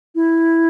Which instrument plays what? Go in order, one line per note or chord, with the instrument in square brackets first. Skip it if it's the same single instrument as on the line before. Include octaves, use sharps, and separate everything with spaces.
[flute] E4